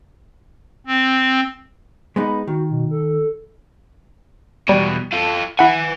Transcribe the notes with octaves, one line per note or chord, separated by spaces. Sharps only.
C4
G#3 B3 D#4 B5
D#3 F#4
B2
A4
E2 B2 G3
F4 A4
E4 B4 F#5 G#5